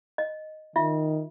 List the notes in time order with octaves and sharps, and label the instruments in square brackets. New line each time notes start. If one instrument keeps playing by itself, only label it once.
[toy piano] D#5
[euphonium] D#3 [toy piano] F4 E5